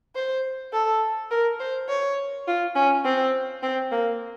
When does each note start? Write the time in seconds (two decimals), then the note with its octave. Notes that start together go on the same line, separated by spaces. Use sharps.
0.15 C5
0.73 A4
1.31 A#4
1.59 C5
1.89 C#5
2.47 F4
2.76 C#4
3.05 C4
3.63 C4
3.92 A#3